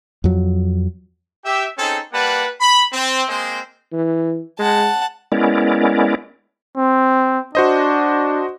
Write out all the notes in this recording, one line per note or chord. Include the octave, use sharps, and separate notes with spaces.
F2 F#3
G4 E5
C4 C#4 D#4 G#4 A4
G3 A#3 B4 F#5 A5
B5
C4
G#3 A#3 C4 C5 D#5
E3
G#3 F#5 A5
G#3 B3 C#4 E4 A#4 D5
C4
D4 F#4 C5 D#5